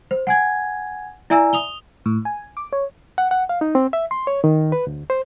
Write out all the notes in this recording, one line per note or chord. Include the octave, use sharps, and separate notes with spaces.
C5
F#5 G#5 G#6
E4 D5 E5 G#5 A#5 E6
D#6 F7 G7
A2
G#5
D6
C#5
F#5
F#5
F5
D#4
C4
E5
C6
C#5
D#3
B4
D2
C5